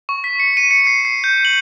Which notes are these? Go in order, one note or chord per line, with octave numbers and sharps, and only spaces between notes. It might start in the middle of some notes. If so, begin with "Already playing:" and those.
C#6
B6
C#7
D#7
C#7
C7
C7
G6
F#7